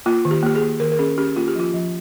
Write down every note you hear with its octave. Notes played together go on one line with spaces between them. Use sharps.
A#3 F4
D#3
G4
A#3 G4
G#4
A#3
D#3 A#4
A#4
C#4 G#4
C#4 G4
A#3 F4
G4
F3 F4
F3